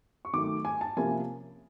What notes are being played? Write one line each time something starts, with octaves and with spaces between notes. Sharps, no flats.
C#6
D#3 F#3 A3 D6
G#5
A5
C3 F3 A#3 C#4 E4 G#5